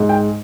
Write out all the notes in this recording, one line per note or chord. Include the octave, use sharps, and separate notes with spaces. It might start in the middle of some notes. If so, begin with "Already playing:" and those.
Already playing: G#2
G5